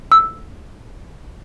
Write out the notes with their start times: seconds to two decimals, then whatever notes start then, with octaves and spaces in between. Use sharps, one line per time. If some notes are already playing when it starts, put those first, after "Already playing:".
0.12 E6